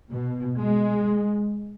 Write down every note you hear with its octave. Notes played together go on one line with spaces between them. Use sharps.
B2
G#3